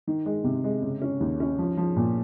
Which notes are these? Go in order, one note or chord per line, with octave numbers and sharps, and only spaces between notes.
D#3
G#3
C3
G#3
C#3
C#4
D#2
C#4
F3
F3
A#2